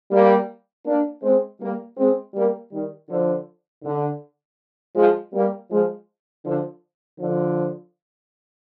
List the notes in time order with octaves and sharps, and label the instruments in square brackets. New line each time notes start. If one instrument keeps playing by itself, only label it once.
[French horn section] G3 A#3
A#3 D4
G#3 C4
G3 A#3
G#3 C4
G3 A#3
D#3 G3
D3 F3
D3
F3 G#3
G3 A#3
F3 G#3
D3 F3
D3 F3